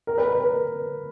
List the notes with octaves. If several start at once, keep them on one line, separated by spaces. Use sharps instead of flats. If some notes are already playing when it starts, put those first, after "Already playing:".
A#4
B4
A#4
B4